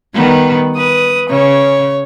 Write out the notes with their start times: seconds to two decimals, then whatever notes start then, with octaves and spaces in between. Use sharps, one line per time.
0.14 D#3 G3 B3
0.77 B4 D#6
1.29 C#3 C#5